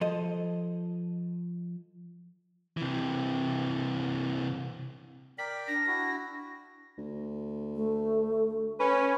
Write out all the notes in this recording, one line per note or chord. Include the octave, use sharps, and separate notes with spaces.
F3 A4 D#5
C3 E3
A#4 D5 G5 B6
D4 A#6
E4 F#4
D2
A3
C#4 B4